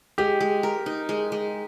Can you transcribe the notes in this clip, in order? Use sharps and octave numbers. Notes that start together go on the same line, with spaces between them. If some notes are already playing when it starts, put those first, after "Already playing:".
G#3 G4
G#3
A#4
D#4
G#3
G#3